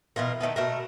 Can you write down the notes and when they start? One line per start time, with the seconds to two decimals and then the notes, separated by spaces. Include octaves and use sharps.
0.16 B2 E3 F4 A#4
0.41 D#3 G#3 A3 B3
0.56 B2 A3 A#4